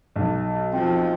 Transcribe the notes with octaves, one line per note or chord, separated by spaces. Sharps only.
B1
F3 C4